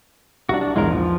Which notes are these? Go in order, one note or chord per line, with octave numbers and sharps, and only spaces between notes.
C2 D4 F#4
D4
A#1 E2 G#2 G#3 A#4
F3